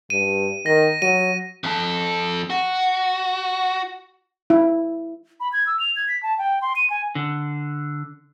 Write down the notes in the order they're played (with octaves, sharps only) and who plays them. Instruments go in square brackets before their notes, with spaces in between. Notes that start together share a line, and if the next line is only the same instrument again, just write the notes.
[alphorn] G2 [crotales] D#7
[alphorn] D#3 [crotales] A#6
[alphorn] F#3 [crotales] D#7
[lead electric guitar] F2 A4
F#4
[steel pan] E4
[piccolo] B5
G#6
E6
F7
G#6
B6
A5
G5
C6
D#7
G#5
[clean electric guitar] D3